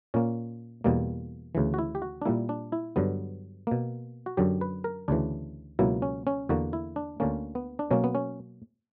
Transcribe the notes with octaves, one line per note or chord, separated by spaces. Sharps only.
A#2 A#3 C#4
E2 B2 G3 A#3
D2 C#3 E3
F#4
E4
G4
F#4
D4
A#2 G3 A#3 E4
D4
E4
G2 D3 F#3 B3
B2 A#3
F#4
F#2 D3 F#3 G4
B4
A#4
D2 C#3 E3 D4
C#2 B2 F#3 A#3 E4
C#4
C#4
E2 D3 A#3 F#4
E4
D4
D2 D3 A#3 C#4
B3
D4
B2 F#3 A#3 C#4
B3
C#4